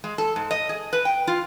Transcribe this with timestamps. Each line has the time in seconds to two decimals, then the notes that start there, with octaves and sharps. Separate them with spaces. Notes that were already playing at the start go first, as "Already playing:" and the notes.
0.04 G#3
0.18 A4
0.36 G#2
0.51 D#5
0.69 G#4
0.93 B4
1.05 G5
1.27 F4